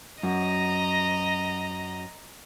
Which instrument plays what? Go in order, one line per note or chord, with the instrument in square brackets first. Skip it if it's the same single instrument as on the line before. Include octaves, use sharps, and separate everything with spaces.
[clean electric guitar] F#2 [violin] D#5 A#5